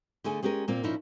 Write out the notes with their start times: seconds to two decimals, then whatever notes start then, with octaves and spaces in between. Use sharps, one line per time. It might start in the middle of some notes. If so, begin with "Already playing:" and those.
0.24 D3 A3 G#4 G#5
0.43 G#3 C#4 G4 G#4 A#4
0.68 A#2 A#3 C4 F4
0.83 A#2 F3 C#4 D#4 E4